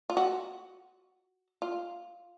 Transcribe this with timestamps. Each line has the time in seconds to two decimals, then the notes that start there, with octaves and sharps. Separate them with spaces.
0.10 F4
0.17 F#4
1.62 F4